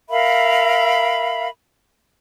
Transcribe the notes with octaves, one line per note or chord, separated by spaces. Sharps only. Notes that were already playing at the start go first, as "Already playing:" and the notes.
A#4 E5 F5 B5